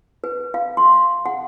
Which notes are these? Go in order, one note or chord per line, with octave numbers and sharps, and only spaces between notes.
B4
F5
C6
F#5